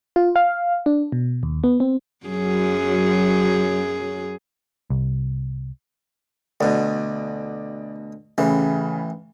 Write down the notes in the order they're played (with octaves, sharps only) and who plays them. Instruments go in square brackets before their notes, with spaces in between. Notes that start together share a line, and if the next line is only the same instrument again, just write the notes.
[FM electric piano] F4
F5
D4
B2
D#2
B3
C4
[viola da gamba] F#2 F#3 G#4
[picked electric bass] C2
[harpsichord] D2 B2 [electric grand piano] D5
[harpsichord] A1 E3 [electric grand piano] C#3